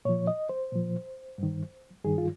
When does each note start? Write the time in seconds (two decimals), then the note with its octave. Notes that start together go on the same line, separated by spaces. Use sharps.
0.05 A#2 F3 C#5
0.27 D#5
0.49 C5
0.72 A#2 F3
1.38 G2 D#3
2.05 G2 D#3 G#4
2.18 F4